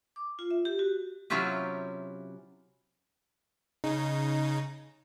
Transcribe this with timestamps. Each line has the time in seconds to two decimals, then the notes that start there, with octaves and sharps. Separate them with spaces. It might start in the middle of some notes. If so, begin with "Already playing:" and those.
0.16 D6
0.39 F4
0.51 E5
0.65 G4
0.79 F#4
1.30 C3 F#3 C#4 E4 F4 G4
3.84 C#3 D#4